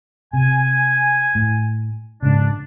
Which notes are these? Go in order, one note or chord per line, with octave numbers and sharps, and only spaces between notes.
C3 G#5
A2
G#2 C#3 D4